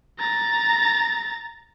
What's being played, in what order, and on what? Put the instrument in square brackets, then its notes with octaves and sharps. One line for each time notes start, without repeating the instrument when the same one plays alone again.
[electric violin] A#5 A6